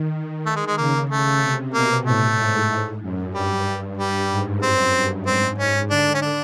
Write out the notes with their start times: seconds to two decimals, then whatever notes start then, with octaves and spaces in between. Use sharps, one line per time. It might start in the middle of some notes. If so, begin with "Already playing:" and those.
Already playing: D#3
0.46 A3
0.56 G#3
0.67 G#3
0.77 C#3 A#3
1.09 A3
1.42 C3
1.74 B2 A#3
2.05 A2 A3
2.37 G#2
3.02 F#2
3.34 G2 G3
3.97 G3
4.30 G#2
4.62 F#2 C4
4.93 G2
5.26 G#2 C4
5.58 C#4
5.90 D3 D4
6.14 C#4
6.22 D4